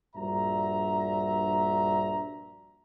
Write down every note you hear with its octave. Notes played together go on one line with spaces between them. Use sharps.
A#1 G2 D4 F#4 E5 A#5